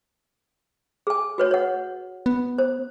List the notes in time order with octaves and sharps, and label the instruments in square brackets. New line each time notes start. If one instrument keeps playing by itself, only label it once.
[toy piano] G#4 G#5
F#4 B4 C#5
C#5 F#5
[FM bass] B3
[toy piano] C5